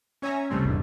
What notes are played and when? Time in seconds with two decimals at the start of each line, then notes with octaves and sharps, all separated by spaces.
0.22 C#4 C#5 E5 G#5 A#5
0.50 C#2 C3 G3 A3 C4
0.64 G#1 E2 B2 D3